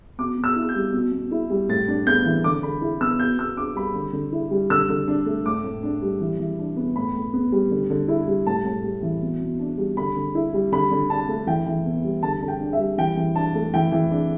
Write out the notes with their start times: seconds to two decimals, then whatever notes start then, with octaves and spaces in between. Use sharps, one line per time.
0.18 B2 D6
0.37 B2
0.44 E6
0.56 E4
0.69 G6
0.75 G3
0.93 B2
1.12 B2
1.31 E4
1.50 G3
1.69 A2 A6
1.88 D4
2.07 B3 G6
2.25 E3
2.44 D3 D6
2.63 D3 B5
2.82 E4
3.01 B3 E6
3.19 B2 G6
3.38 B2 E6
3.57 D4 D6
3.75 G3 B5
3.95 D3
4.13 D3
4.32 E4
4.51 G3
4.70 D3 E6
4.89 D3
5.08 D4
5.26 A3
5.46 A2 D6
5.64 A2
5.83 D4
6.02 G3
6.20 E3
6.39 E3
6.59 D4
6.77 B3
6.96 A2 B5
7.15 A2
7.33 B3
7.52 G3
7.71 D3
7.90 D3
8.08 E4
8.28 G3
8.47 A2 A5
8.65 A2
8.84 G3
9.03 E3
9.22 B2
9.41 B2
9.59 D4
9.78 G3
9.97 D3 B5
10.16 D3
10.35 E4
10.54 G3
10.72 D3 B5
10.92 D3
11.10 D4 A5
11.29 A3
11.47 E3 G5
11.66 E3
11.86 B3
12.04 G3
12.23 D3 A5
12.42 D3
12.48 G5
12.60 D4
12.73 E5
12.79 G3
12.98 E3 G5
13.17 E3
13.35 D4 A5
13.55 A3
13.73 E3 G5
13.92 E3
14.11 D4